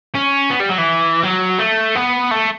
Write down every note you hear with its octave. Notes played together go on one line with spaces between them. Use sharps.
C#4
B3
G3
F#3
E3
F#3
A3
B3
A3